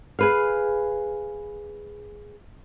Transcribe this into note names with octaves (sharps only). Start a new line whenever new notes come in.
G#4 B4 F5